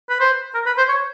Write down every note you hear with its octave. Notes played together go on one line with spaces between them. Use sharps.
B4
C5
A#4
B4
C5
C#5